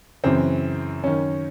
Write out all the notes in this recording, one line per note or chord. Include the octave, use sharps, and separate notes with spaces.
F#2 C#3 E3 C4
F#2 D#3 C#4